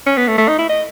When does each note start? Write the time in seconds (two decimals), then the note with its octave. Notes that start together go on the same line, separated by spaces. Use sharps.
0.07 C#4
0.17 B3
0.28 A3
0.38 A3
0.48 D#4
0.59 E4
0.69 D#5